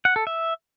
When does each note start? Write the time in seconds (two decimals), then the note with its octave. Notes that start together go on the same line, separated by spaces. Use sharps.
0.05 F#5
0.16 A4
0.27 E5